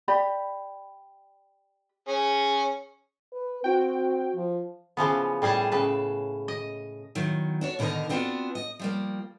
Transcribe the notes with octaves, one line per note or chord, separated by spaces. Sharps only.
G4 D5 B5
C#4 G#4
B4
C4 F#4 G5
F3
C#3 E3 F3 B3
A2 G3 G#4 G#5 A5
C#3 B4 A5
D#5
E2 D#3 F#3
D4 F#4 C#5
B2 D3 D#3 D#4 A#4 D#5
B3 C4 D4 F4 F#4
D#5
F3 G3 A#3